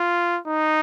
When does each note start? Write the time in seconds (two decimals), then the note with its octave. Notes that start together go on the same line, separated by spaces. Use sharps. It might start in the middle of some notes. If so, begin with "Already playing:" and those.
Already playing: F4
0.47 D#4